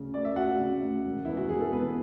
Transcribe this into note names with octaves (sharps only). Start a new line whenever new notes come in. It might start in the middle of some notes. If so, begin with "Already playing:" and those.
Already playing: D2 C#3
D2 D5
E5
D2 F#4 F#5
C#3
D2
E1
E2 E4
F#4
E2 G#4
A4
E1 B3 B4